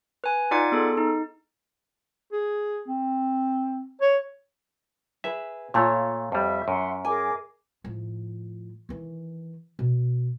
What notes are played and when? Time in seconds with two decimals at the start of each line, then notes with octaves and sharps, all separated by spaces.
0.24 B4 G#5
0.51 D#4 F4 D5 F#5 D6 G#6
0.72 B3 G#4 A4
0.97 D#4
2.32 G#4
2.88 C4
4.01 C#5
5.24 G#4 B4 E5
5.74 A#2 A3 F4 C#5 A5
6.32 F2 G3 E5
6.68 F#2 E5 F#5 C6
7.05 G#4 A#4 G#5 D6
7.84 A2 F3
8.89 D#3 E3
9.79 B2